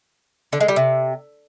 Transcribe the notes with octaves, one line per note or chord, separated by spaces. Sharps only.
D3
G#3
G3
C3